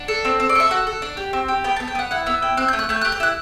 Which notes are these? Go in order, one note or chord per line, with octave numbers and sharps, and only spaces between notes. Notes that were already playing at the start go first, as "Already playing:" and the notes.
Already playing: D4 F#5
A4
C4
C4
D5
A4 E5
F#4 F#5
A4
D4
G4
C4
G4
B3 G5
B3 A5
G5
B3 F#5
E4 F#5
B3 E5
E4 G5
C4 F#6
A3 G6
F#6
A3 G6
G4 F#6
G6
E4 F#6